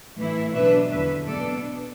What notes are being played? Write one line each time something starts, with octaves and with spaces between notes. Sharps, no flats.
A2 E3 A3 E4
B2 F#3 D4 B4 E5
E2 D3 F#3 B4 E5
B2 B3 D4 A4 D5